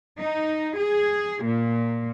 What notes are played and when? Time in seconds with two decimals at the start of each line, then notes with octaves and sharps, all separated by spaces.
0.19 D#4
0.77 G#4
1.44 A#2